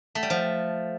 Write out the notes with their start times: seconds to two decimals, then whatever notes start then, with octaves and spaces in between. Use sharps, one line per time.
0.15 A3
0.23 G3
0.30 F3